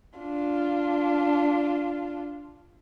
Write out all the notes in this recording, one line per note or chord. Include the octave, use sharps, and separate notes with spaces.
D4 F4